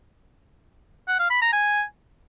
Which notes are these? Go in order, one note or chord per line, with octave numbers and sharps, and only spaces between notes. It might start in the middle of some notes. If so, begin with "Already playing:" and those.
F#5
F5
B5
A#5
G#5